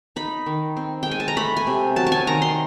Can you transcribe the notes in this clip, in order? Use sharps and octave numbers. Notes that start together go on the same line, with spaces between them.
D#4 B5
D#3
C4
G#3 G5
G#5
A5
A#5
A3 B5
G#5
C3
F#3 A5
A5
G#5
D#3 A#5
C6